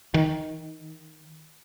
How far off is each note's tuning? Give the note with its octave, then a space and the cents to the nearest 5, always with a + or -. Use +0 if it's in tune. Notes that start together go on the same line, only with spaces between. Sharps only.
D#3 +10